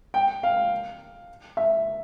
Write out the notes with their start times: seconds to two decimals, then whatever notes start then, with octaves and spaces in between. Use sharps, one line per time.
0.14 G5
0.43 F5
1.57 E5